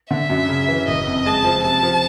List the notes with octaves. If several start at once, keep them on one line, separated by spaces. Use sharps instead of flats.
D3 E5
F#2
C#3
E3
F#1 D#5
F2
G#3 A5
F3
C3 A5
F3